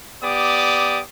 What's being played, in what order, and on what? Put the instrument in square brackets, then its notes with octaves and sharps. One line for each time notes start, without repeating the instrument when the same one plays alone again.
[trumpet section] B3 G4 D5 D6 D#6